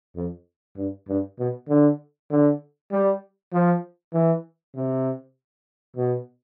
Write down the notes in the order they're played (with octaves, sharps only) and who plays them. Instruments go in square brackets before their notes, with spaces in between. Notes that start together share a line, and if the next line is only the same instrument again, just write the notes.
[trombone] F2
G2
G2
B2
D3
D3
G3
F3
E3
C3
B2